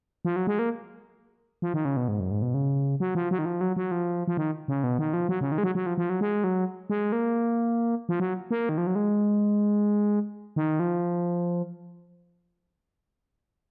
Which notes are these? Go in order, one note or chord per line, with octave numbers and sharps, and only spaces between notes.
F3
F#3
G#3
A#3
F3
D#3
C#3
B2
G#2
F#2
G#2
B2
C#3
F#3
F3
F#3
D#3
F3
F#3
F#3
F3
F3
D#3
C#3
B2
D#3
F3
F#3
C#3
D#3
G#3
F#3
F#3
F3
F3
F#3
G#3
F#3
G#3
A#3
F3
F#3
A#3
D#3
F3
F#3
G#3
D#3
F3